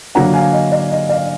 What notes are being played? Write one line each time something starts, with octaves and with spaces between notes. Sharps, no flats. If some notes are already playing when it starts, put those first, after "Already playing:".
D3 F#3 A#3 D4 F#5 A#5
F5 G#5
D#5
D5
D#5
D5 F5